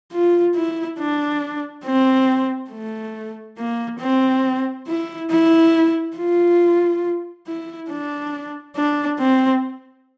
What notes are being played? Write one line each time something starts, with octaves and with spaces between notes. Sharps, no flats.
F4
E4
D4
C4
A3
A#3
C4
E4
E4
F4
E4
D4
D4
C4